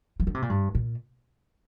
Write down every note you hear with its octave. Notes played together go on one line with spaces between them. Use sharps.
F3
D3
C3
A#2
G2
A#2